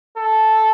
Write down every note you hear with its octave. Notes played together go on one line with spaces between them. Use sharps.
A4